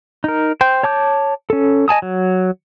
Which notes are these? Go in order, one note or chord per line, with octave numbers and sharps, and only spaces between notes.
D#4 A#4
C5 G5
C#5 A5 D6 G6
C#4 A4
D#5 G#5 A5 D#6
F#3